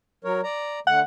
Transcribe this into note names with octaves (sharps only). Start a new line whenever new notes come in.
F#3 A#4 C#5
D5 A#5
D3 A3 F#5